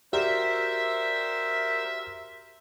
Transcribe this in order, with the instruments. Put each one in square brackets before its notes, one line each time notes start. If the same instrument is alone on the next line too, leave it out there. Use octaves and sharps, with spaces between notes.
[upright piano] F#4 G4 D5 [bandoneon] A#4 C5 [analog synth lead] E5